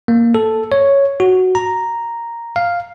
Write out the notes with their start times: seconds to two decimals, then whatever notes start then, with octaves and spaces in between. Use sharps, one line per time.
0.08 A#3
0.35 A4
0.72 C#5
1.20 F#4
1.55 A#5
2.56 F5